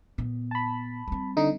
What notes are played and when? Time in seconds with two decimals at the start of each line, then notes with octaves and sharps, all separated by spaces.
0.18 A#2 B3
0.51 A5 B5
1.08 G3 C4
1.37 D3 D#4